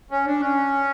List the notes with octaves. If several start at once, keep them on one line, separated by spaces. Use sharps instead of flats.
C#4
D4
C#4